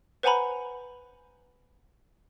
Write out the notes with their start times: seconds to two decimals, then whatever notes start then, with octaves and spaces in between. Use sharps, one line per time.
0.23 B4 C5 F#5 G#5 A#5 B5